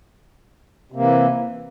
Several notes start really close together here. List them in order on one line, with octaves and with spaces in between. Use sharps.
C3 A#3 E3